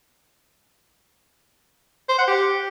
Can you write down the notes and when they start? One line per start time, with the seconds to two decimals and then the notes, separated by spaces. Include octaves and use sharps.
2.09 C5
2.18 F#5
2.28 G4